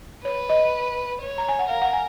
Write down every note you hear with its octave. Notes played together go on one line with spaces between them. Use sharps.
B4 C#5
D#5
C#5
A#5
G#5
F#5
A#4 F5
F#5
G#5